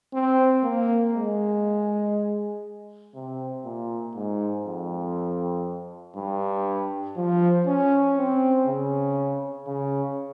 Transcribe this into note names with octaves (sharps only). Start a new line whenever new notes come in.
C4
A#3
G#3
C3
A#2
G#2
F2
G2
F3
C#4
C4
C#3
C#3